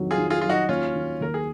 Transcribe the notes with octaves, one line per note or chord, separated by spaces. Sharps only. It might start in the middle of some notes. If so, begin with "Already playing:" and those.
Already playing: F2 D#3 F#3
F4 G#4
D#3
F4 G#4
F#3 F4
D#4 F#4
D#2 C#4 F4
D#3
D#2 A#4
G#4